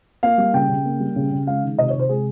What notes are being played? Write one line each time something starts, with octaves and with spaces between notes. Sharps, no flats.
A#3 F5
G3
C#3 G5
C#3
A#3
G3
C#3
C#3
G#3 F5
D#3
C3 D#5
C#5
C3
C5
G#3 G#4